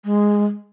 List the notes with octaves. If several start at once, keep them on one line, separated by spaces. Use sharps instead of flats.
G#3